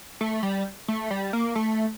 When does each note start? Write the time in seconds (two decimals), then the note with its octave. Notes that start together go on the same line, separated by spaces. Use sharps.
0.21 A3
0.43 G3
0.88 A3
1.11 G3
1.33 A#3
1.55 A3